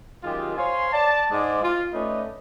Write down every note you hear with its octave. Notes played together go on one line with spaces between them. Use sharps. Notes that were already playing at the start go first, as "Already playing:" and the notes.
F#2 D#3 G#3 F4 G4
C5 C#5 F5 G#5 C6
D5 A5
G#2 G#3 D5
F4
A3 C#4 D#4 B4 D5 D#5